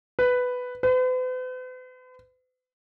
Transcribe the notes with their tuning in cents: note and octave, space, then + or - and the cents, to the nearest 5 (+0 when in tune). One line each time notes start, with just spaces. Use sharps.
B4 +5
B4 +45